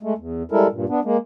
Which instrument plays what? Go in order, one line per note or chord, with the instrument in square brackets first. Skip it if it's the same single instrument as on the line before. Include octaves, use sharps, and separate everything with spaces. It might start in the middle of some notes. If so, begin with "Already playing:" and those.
[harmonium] G#3 A3
E2
G3 G#3 E4 A4 A#4
G2 A#2
B3 D4
G#3 A#3